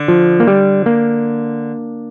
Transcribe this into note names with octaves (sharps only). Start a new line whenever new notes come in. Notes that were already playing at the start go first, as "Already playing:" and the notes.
Already playing: D3
F3
A#3
G3
A#3